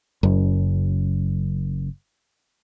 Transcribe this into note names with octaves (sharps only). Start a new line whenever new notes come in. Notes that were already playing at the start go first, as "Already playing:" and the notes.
F#1 F#2